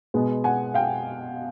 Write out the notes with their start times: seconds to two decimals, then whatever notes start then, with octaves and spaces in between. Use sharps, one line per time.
0.14 B2 G#3 B3
0.44 F#5 G#5
0.74 F5 G5